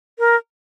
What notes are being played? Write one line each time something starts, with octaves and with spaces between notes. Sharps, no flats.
A#4